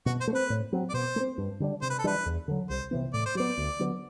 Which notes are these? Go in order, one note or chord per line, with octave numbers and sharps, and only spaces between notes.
B2 F#4
C5
A3
C4 B4
A2
F#3 C4
D5
B2 C5
A3
C4
G2
D3 G3 D4
C3 C5
B4
A4
E3 G3 D4 B4
E2
D3 F#3
C2 C5
C3 E3 B3
A2 D5
C5
F#3 B3 D5
D2
D3 F#3 B3